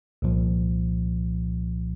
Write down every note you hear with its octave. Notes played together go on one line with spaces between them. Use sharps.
C2 A#2 F3